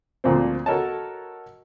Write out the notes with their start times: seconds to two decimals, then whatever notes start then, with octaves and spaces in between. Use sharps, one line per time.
0.24 D2 A#2 F3 C4
0.66 F#4 A4 A#4 C#5 D#5 A5